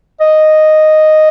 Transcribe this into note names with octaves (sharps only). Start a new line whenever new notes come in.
D#5